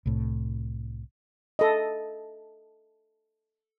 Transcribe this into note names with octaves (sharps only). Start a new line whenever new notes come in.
C2 A2
A4 D#5